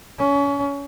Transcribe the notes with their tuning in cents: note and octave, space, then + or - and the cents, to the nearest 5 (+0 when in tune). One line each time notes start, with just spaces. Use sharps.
C#4 +30